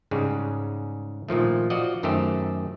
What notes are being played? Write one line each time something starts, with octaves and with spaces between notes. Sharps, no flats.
G#2 C#3 G3 G#3 G#4
A#2 D#3 F3 A3
F3 F#4 D5 D#5
F#2 D#3 A3 G4 C5